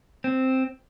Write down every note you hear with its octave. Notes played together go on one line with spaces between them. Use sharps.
C4